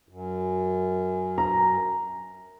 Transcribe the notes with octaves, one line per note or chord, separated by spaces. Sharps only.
F#2
A#5